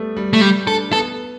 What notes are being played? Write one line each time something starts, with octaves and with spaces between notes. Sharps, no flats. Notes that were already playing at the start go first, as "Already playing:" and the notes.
Already playing: G3 A3 B3
G3
A3
G3
D4 A4
B3 A4